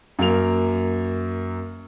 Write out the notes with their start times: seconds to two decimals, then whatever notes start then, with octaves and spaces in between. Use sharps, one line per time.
0.19 F#2 F#3 A#3 F7